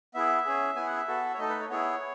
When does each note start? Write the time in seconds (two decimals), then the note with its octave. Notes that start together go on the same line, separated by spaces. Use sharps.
0.14 B3 E4 G#4 E5
0.45 C#4 G#4
0.76 B3 E4 G#4 G#5
0.86 F#5
0.97 E5
1.08 B3 F#4 A4
1.34 C#5
1.38 A3 D#4 A4 D#5
1.49 B4
1.60 C#5
1.70 B3 E4 G#4 C#5